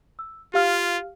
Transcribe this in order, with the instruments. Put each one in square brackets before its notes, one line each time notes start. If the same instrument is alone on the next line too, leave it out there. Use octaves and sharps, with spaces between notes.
[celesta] E6
[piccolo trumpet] F4 [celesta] G4 F5 F6